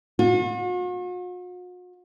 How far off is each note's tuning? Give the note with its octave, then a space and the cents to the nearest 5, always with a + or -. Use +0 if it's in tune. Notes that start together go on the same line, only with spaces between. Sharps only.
F#4 -45